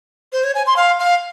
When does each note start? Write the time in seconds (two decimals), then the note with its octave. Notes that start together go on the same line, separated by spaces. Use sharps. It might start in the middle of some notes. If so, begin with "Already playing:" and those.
0.33 C5
0.44 C#5
0.55 G#5
0.67 C6
0.77 F5
0.99 F5